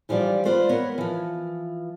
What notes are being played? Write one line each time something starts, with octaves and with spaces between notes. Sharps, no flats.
E3 F3 G3 F4 D5
F4 B4 C5 D5
B3 A#4 C#5
E3 F3